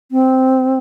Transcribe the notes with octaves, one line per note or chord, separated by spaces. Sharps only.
C4